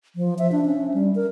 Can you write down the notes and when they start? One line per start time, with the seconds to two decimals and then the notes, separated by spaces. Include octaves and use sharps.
0.16 F3
0.39 E5
0.52 D4
0.66 C#4
0.94 G3
1.15 A#4